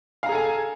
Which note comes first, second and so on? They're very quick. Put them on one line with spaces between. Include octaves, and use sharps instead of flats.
F5 A#5 G#4 A4 G#5